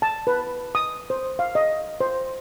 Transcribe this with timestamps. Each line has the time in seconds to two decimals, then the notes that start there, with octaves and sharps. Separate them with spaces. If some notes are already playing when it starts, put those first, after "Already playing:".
0.02 A5
0.27 B4
0.75 D#6
1.10 C5
1.39 F5
1.55 D#5
2.00 C5